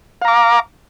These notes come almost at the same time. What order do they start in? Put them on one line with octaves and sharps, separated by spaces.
F5 A#5 D6